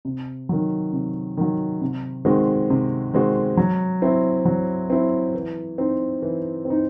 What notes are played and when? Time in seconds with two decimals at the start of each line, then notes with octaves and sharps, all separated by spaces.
0.05 C3
0.49 D#3 F#3
0.93 C3
1.37 D#3 F#3
1.81 C3
2.25 D#3 G#3 C4 F#4
2.70 C3
3.13 D#3 G#3 C4 F#4
3.57 F#3
4.02 C4 E4
4.45 F#3
4.90 C4 E4
5.34 E3
5.78 C4 D#4
6.22 E3
6.65 C4
6.70 D#4